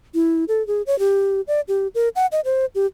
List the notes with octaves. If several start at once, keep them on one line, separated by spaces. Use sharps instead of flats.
E4
A4
G#4
C#5
G4
D5
G4
A#4
F#5
D#5
C5
G4